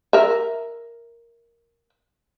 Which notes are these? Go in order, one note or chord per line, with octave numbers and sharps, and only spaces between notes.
A#4 E5